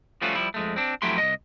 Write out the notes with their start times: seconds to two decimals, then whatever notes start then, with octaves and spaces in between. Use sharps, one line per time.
0.22 F3 G3 A3 C#4 F4 F#4
0.35 F3 G3 E4
0.54 F2 G#3 A3
0.76 C4 D4
1.02 F2 F#3 A3 E4 G4 C6
1.18 C2 D#5